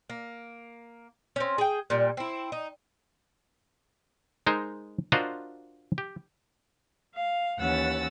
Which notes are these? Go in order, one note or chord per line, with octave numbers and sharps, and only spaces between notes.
A#3
C4 C#4
G#4 G5
A#2 G3
C4 E4
D#4
G#3 D#4 A#4 C5
D4 F4 F#4 A#4 C5 D#5
G4
F5
D#2 E3 C#4 F#5 E6 A6